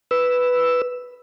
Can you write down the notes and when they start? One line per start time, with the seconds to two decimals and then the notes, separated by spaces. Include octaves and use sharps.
0.11 B4 E6